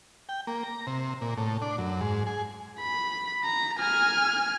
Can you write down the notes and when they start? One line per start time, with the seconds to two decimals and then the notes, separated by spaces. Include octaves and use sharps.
0.29 G5
0.47 A#3
0.63 A#5
0.87 C3
1.21 A#2
1.37 A2
1.62 D4
1.78 F#2
2.01 G#2
2.27 G#4
2.80 B5
3.44 A#5
3.79 G#5 F6